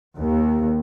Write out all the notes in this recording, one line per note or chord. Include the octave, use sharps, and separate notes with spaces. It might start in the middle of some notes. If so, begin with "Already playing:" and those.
D#2